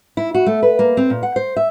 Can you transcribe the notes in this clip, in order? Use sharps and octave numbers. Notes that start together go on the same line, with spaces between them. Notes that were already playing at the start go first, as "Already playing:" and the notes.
E4
F#4
A3
B4
A#3
C4
A#2
F#5
C5
E5